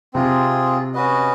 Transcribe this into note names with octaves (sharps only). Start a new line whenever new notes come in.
C3 C4 F4 G#4
C#4 F#4 B4 D#5